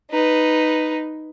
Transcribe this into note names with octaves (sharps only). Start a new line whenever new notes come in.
D#4 B4